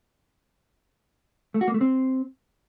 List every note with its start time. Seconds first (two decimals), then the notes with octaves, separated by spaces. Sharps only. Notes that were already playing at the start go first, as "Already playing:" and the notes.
1.54 A3
1.61 F#4
1.68 A#3
1.74 A3
1.81 C4